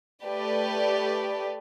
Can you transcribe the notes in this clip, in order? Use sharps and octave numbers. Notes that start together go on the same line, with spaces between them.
A3 G4 B4 D5